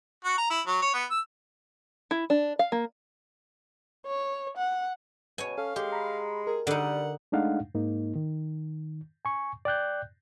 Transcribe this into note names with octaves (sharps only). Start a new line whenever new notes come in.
F#4
A#5
E4
F#3
C#5
B3
E6
E4
D4
F5
A#3
C#5
F#5
B2 C#5 G#5
C#4 A4 F5
G#3 G4
A#5 B5
G#4 A#4
D3 G3 D#4 F#5
G#3 A3 D4 D#4 F5 F#5
G#2 A#3 D#4
D#3
G#5 C#6
D5 G5 F#6 G6